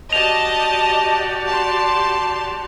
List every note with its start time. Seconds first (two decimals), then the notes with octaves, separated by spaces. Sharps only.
0.13 F#4 G4 D5 D#5 A5 F7
1.46 A5 C6